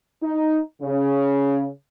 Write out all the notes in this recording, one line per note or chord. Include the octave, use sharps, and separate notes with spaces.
D#4
C#3